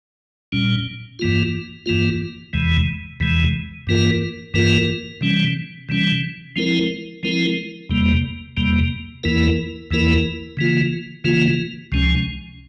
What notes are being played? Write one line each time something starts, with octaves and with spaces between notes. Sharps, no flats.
A#2 G3 C#4
G2 E3 A#3 F4
G2 E3 A#3 F4
E2 C3 E3 G#3
E2 C3 E3 G#3
G2 E3 A#3 F4 A#4
G2 E3 A#3 F4 A#4
C3 E3 G3 C#4
C3 E3 G3 C#4
F3 G#3 C4 E4 A#4
F3 G#3 C4 E4 A#4
E2 C3 G3 A#3
E2 C3 G3 A#3
E2 E3 A#3 E4 A#4
E2 E3 A#3 E4 A#4
C#3 E3 A#3 F4
C#3 E3 A#3 F4
C#2 C3 F3 G#3 C#4